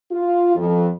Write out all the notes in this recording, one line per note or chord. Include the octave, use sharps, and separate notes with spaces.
F4
F2